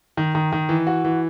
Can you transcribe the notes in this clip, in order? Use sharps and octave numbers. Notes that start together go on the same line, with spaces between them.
D#3
D#3
D#3
E3
F#4
E3